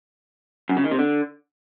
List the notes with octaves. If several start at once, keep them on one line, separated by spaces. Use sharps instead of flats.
F#2
C#3
D#3
C3
D3